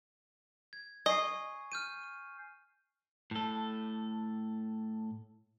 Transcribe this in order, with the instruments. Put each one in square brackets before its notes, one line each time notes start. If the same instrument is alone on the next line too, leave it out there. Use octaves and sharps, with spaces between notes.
[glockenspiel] G#6
[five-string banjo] D#5 [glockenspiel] G#5 C#6 C7
[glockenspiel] F6 G6 D#7
[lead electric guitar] A2 A4